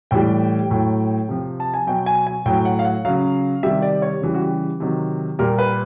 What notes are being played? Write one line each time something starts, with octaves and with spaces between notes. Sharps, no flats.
A2 E3 G3 G5
A2 F#3
C3 F3
A5
G#5
B2 F#3 G5
G#5
G#5
A2 F#3 G5
F#5
F5
F#5
C#3 F#3 F5
C3 D#3 G3 E5
D5
C#5
C#3 E3 G3
F#4
G4
C3 D#3 F#3
A#2 G3 A#4
B4